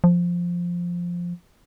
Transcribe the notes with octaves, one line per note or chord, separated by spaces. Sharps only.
F3